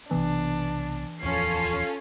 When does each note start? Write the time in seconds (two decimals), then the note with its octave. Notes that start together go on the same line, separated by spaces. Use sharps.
0.11 B1 C3 E3 B3 D4
1.23 D1 E2 F3 C#4 F4 A4 C7